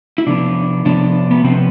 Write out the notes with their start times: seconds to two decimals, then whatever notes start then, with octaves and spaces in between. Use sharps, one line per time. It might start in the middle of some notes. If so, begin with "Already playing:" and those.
0.18 E4
0.27 C3 F3 B3 D4
0.85 C3 F3 B3 D4
1.31 B3
1.44 C3 F3 B3 C4